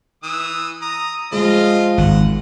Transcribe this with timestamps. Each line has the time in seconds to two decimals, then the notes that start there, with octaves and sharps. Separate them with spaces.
0.23 E3 D#6 E6
0.82 A#5 D#6
1.32 F3 G#3 F4 D#5
1.98 G#1 F#5